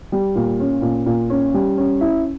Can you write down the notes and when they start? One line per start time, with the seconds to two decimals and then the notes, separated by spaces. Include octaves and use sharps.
0.12 G3
0.36 A#2
0.60 C#4
0.82 A#2
1.06 A#2
1.30 C#4
1.54 G3
1.77 C#4
2.01 E4